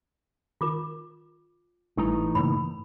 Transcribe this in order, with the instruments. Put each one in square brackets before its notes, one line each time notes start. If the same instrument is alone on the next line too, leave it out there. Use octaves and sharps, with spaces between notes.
[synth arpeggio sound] D#3 A#4 [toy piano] F4 D6
[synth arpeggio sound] G#1 G3 [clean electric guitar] A2 D#4 A#5 [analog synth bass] E3
[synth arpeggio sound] G2 C#3 A#3 [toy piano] B5